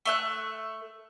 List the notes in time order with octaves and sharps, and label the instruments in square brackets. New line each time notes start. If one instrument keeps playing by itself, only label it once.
[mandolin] A3 E5 F#6